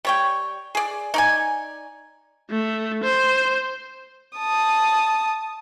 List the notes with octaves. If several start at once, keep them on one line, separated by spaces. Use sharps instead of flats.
G3 C#5 G5
G#4 D5
D#4 D5 G#5
A3
C5
A5 D#6